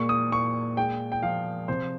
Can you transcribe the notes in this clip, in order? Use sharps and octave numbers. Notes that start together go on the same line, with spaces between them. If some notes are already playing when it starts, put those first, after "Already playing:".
Already playing: A#2 G#3 C#6
D#6
A#2 C#6
G#3 G5
G5
F3 F5
C3 C5